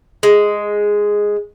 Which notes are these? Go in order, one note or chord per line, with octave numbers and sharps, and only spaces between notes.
G#3